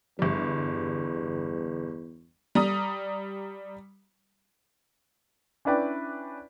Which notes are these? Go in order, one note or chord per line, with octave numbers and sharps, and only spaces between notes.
G1 E2 G3
G3 A#5 D#6
C#4 D4 E4 B4 D5 G5